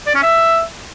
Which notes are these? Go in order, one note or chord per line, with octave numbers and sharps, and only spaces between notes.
D5
C#4
E5